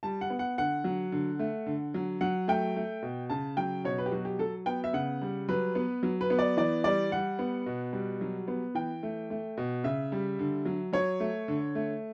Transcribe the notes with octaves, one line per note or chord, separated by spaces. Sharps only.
G3 A5
F#5
B3
F#5
D3 F#5
F#3
D3
A3
D3
F#3
F#3 F#5
A3 G5
A3
B2
C#3 A5
F#3 G5
B2 C#5
B4
G4
F#3 F#4
G4
F#3 A4
B3 G5
E5
C#3 F#5
G3
F#3 B4
B3
F#3
B4
B3
D5
E3 D5
G3 D5
G3 F#5
B3
B2
G3
F#3
B3
E3 G5
A3
A3
B2
C#3 E5
G3
D3
F#3
F#3 C#5
A3
D3
A3